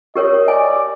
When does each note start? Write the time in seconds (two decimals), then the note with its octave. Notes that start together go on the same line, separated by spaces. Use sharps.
0.16 G4 A#4 C#5 D#5
0.48 D5 G#5